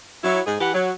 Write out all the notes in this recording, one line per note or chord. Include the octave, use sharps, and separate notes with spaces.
F#3 E4
G#2 G#4
E3 G4 B4 F#5
F#3